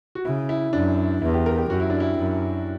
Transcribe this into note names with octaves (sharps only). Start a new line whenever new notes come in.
F#4
C#3 E4
E4
F#2 D4
E2 E4
G4
A#4
G4
F#2 F#4
E4
D4
E4
F#2